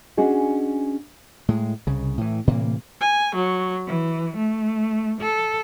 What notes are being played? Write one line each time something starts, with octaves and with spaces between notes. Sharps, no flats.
C#4 D4 F#4 G#4 D#5
A2 G#3
C2 C#3
A2 E3
A2 C3 E3 A#3
G#5
F#3
E3
A3
A4